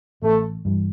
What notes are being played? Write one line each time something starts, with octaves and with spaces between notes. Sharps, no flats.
A1 A3
G2 E3 G3